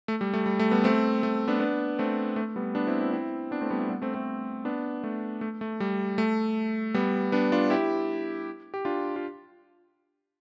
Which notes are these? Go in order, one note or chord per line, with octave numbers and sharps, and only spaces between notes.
A3
G3
A3
G3
A3
G3 B3
A3 C4
A3
B3 D4
B3 D4
A3 C4
A3
G3 B3
B3 D4
C4 E4
C4 E4
C4 E4
B3 D4
A3 C4
G3 B3
A3
G3 B3
A3 C4
A3 C4
B3 D4
A3
A3
A3
G3
A3
G3 B3
B3 D4
D4 F4
E4 G4
G4
D4 F4
F4